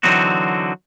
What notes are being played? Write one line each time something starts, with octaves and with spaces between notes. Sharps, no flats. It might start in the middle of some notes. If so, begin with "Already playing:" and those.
D3 E3 F#3 C4 D#4 F#4